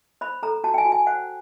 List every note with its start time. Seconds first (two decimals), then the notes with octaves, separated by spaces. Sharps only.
0.21 C5 B5
0.43 A4 A#5
0.64 F#4 A5
0.74 G5
0.78 G#5
0.85 F#4
0.92 G#5
1.07 C5 F#5